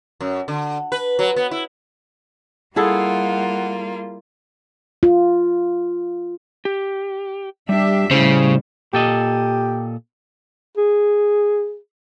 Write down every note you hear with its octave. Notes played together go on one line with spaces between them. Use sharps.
F#2
D3
B4
F#3
B3
E4
G3 A#3 E4 F4 G#4 A4 F#5
F4
G4
G3 D4 G4 E5
A2 C#3 G3 E4 C5
A#2 G4 A4 D#5
G#4